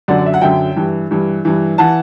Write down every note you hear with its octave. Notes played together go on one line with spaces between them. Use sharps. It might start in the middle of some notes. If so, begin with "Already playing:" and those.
F#2 D3 F#3 D5 F#5
D5
E5
F#5
F#2 D3 F#3 E5 G5
G2 E3
G2 E3
G2 E3
E3 F#5 A5